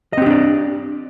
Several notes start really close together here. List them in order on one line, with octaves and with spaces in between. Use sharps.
D#5 C4 G4 D4 D5